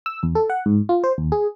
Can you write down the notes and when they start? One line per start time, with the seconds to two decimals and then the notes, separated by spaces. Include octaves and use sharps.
0.06 E6
0.23 E2
0.35 A4
0.50 F#5
0.66 G#2
0.89 F4
1.04 C5
1.18 D#2
1.32 G#4